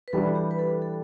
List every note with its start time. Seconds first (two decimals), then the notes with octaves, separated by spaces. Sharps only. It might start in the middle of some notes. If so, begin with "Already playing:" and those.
0.08 B4
0.13 E3 G3 D4 F#4 A4
0.35 G4
0.51 B4
0.59 A4
0.82 A4